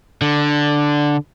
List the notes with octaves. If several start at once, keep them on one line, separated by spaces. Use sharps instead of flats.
D3